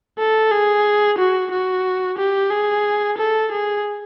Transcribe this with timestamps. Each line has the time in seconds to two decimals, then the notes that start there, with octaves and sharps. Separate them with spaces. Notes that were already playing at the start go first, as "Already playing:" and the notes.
0.18 A4
0.51 G#4
1.18 F#4
1.51 F#4
2.18 G4
2.50 G#4
3.18 A4
3.51 G#4